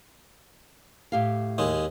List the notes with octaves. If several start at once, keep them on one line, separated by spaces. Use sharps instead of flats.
A2 G4 F5
D#2 G#3